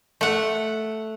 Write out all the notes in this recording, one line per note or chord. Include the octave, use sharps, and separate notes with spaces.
A3 F#5